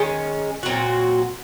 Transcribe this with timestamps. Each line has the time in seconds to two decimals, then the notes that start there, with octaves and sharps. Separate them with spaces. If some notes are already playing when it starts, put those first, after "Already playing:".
Already playing: D#3 G#3 C#4
0.63 A#2 F#3 C4 F#4